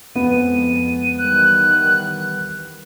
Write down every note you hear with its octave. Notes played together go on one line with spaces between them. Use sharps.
F2 G#3 B3 D#7
D#3 E3 G3 F#6